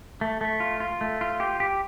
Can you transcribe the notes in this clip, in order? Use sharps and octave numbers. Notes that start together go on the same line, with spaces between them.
A3
A3
F4
F4
A3
F4
G4
G4